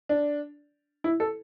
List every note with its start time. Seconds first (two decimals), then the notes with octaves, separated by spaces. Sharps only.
0.09 D4
1.04 E4
1.20 A4